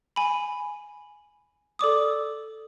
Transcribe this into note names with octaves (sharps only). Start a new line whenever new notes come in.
G#5 B5
A4 D5 D6 D#6